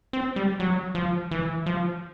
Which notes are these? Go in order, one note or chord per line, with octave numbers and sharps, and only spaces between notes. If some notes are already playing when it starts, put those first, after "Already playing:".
C4
G3
F#3
F3
E3
F3